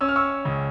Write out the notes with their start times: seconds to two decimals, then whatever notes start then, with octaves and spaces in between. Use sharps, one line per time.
0.01 C#4 E6
0.09 F6
0.16 C#6 E6
0.45 C#2